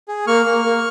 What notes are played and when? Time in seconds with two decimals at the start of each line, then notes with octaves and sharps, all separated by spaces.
0.08 G#4
0.27 A#3 C#6 F6
0.46 A#3
0.65 A#3